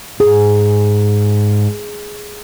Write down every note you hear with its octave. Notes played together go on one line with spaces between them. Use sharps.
G#2 G#4